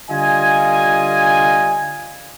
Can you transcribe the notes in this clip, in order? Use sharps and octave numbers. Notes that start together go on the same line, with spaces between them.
D3 G3 F4 D#5 G#5